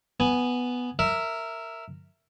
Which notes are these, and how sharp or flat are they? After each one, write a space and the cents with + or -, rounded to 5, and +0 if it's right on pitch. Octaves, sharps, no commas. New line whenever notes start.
B3 +0 G#5 +0
A#4 -15 E5 +0